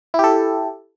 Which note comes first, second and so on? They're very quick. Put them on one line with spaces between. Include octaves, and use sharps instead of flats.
E4 G4 A4